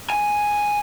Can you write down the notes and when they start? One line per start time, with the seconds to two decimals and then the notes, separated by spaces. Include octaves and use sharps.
0.10 G#5